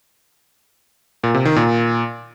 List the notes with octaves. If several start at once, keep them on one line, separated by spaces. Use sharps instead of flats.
A#2
C3
D#3
A#2